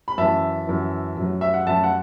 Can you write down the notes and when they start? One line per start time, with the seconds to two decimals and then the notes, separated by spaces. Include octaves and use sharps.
0.08 B5
0.18 F#2 E3 E5 A5
0.67 F#2 E3
1.17 F#2 F#3
1.41 E5
1.54 F#5
1.67 F#2 F#3 E5 A5
1.84 F#5